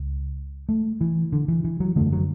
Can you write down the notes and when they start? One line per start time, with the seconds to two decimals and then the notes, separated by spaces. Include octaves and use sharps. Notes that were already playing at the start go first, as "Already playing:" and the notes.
Already playing: C#2
0.69 A3
1.01 E3
1.32 D3
1.48 E3
1.64 E3
1.80 F#3
1.96 F#2 D3 A3
2.12 F#3